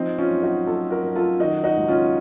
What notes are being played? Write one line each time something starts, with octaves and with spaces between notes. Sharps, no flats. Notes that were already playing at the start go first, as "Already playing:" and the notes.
Already playing: F3 C4 D#4
C#4 F4
F#2
D#4 F#4
F#2 F4 A4
F#4 A#4
F#2
F4 A4
D#3 D#4 F#4
D#4 F#4
C#2
C#4 F4